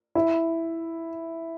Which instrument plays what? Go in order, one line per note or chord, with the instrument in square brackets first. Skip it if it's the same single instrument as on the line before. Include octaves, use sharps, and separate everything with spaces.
[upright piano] E4